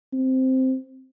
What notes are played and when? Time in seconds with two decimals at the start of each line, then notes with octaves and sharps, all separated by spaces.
0.13 C4